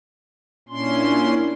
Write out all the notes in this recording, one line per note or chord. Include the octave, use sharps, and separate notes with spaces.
A#2 C#4 D4 E4 C6